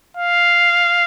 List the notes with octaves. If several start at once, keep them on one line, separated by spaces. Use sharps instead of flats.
F5